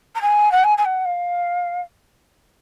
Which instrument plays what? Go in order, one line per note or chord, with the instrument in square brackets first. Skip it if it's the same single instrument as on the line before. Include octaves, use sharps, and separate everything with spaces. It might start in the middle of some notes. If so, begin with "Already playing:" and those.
[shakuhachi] A#5
G#5
F#5
G#5
G#5
F#5
F5